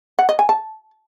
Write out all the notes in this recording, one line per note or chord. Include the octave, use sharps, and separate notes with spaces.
F#5
D#5
G#5
A5